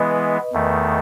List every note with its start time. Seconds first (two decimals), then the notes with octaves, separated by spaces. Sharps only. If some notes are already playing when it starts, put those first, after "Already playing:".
Already playing: E3 G#3 B3 E4 B4 D#5
0.53 E2 D#3 A3